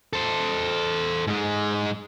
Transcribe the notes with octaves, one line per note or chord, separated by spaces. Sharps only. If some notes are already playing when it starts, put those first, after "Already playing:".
A4 C5
G#2 G#3